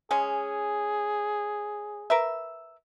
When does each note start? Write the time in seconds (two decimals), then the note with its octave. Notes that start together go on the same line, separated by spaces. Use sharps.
0.11 G#3 C#4 G#4
2.10 A#4 B4 E5